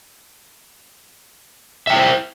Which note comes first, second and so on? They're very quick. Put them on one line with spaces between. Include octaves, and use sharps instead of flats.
E5 G5 E4 C5